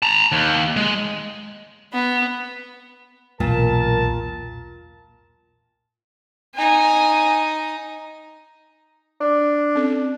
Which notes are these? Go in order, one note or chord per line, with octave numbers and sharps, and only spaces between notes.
A5 A#5
D#2
G#3
B3
E1 B1 A#2 A#4 A5
D#4 G#5
D4
C4 C#4 A4